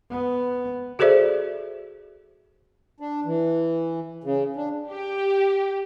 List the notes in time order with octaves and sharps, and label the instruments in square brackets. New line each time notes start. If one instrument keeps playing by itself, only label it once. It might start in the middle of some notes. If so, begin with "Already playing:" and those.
[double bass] B3
[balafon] F#4 G#4 A4 C5 D5 E5
[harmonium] D4
E3
C#3
D4
[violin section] G4